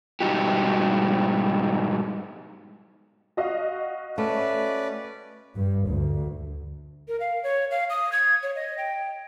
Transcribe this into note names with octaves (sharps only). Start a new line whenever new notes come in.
G#2 B2 G3 D#4 F#4 G4
F#4 D#5 F5
A3 C#4 B4 D5
G2
D2
A#4
F5
C#5
F5
D#6
G#6
C#5
D#5
G5